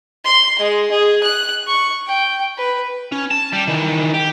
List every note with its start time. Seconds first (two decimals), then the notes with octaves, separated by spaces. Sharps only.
0.25 C6
0.58 G#3
0.91 G#4
1.23 F#6
1.67 C#6
2.07 G5
2.58 B4
3.12 C#4
3.31 A5
3.53 G3
3.68 D#3 E3
4.14 G4